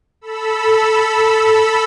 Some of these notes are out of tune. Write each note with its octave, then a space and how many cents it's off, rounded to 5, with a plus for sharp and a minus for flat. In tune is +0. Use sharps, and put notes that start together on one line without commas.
A4 +0 B5 -10 E6 +0